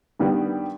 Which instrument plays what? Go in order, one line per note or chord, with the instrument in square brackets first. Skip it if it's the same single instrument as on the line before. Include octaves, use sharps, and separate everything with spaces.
[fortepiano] G2 D#3 G3 B3